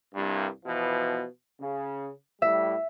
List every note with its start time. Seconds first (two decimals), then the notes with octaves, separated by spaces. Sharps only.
0.14 C2 G2
0.65 B2 E3 F3
1.59 C#3
2.42 A2 G3 E5